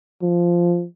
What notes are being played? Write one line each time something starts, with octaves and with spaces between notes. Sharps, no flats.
F3